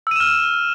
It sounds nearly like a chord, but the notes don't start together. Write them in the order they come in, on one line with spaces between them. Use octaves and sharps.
E6 D#7 E7 F6